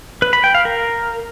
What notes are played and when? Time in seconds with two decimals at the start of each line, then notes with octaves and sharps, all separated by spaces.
0.22 B4
0.33 B5
0.44 G5
0.54 F5
0.65 A#4